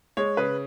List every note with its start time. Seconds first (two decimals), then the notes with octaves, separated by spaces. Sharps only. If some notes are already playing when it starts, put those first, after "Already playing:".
0.17 G#3 C#5
0.37 C#3 B4